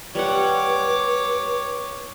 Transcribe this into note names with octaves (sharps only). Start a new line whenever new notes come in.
G3 B4 C#5 F#5 D6